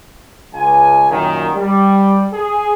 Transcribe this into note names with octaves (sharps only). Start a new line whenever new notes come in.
C#2 G#5
F#2 A#2 D#3
G3
G#4